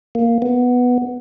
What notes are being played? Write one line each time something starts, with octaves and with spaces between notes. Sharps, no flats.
A#3
B3